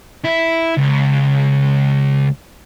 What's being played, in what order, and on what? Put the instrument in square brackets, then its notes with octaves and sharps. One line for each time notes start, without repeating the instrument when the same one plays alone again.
[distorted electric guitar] E4
C#2